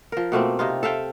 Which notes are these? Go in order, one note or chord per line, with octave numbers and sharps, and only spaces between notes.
F3 A#4
B2 A3 A#3 C4
C3 D#4 F4
A4 E5 F5 G5